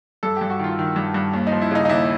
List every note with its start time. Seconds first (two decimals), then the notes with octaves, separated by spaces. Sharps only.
0.23 G2 A4
0.37 G2 G4
0.50 F#4
0.59 D#3 F4
0.79 D#3
0.96 G2
1.14 G2
1.34 D#2
1.47 F3 D#4
1.62 E4
1.71 C#3 D#4
1.85 D#4
1.89 D#2 E4